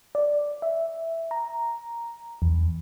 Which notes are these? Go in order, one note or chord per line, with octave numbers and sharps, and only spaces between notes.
D5
E5
A#5
E2